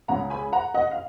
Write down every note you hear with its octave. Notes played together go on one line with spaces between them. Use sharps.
C#2 C#3 F#5 A#5
G#5 B5
F#5 A#5
D#5 F#5
F5